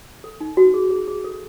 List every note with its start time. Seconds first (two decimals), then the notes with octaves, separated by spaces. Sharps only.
0.24 A4
0.41 D#4
0.57 F#4
0.74 G#4
0.90 G#4
1.08 G#4
1.24 A4